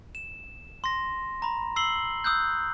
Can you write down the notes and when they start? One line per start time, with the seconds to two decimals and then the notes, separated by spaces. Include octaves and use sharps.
0.15 E7
0.84 C6 A#6
1.42 A#5 B5
1.76 E6 C7 F#7 G7
2.24 D#6 E6 F#6 G6